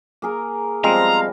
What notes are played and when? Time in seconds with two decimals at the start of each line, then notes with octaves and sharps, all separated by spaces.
0.22 A#3 G#4 A#4
0.84 F3 G3 G#3 B3 C4 F5 A#5